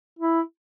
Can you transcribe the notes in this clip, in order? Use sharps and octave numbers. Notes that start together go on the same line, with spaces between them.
E4